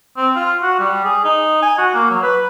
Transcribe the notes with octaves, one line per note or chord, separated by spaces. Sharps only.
C4
F4
F#4
G3
G#4
D#4
G#5
F#4
A#3
F#3
B4